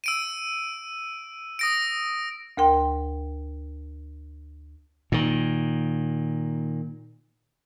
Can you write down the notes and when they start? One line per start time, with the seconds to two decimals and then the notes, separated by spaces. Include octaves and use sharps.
0.04 E6 D7 D#7
1.59 D#6 A#6 D7
2.57 D2 A#4 G5 C6
5.12 A#2 D#3